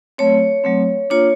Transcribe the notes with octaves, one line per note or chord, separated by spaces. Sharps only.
F#3 A3 C4 C#5
F#3 A3 C4
A#3 D4 F4 C#5